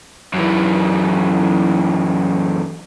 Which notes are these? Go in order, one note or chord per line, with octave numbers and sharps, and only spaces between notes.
F#2 E3